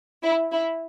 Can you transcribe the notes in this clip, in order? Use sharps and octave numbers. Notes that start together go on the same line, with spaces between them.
E4
E4